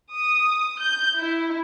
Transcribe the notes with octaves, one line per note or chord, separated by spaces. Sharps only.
D#6
G6
E4